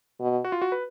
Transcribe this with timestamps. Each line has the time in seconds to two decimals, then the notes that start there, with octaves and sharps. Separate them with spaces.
0.20 B2
0.45 F#4
0.52 F4
0.62 F#4
0.72 B4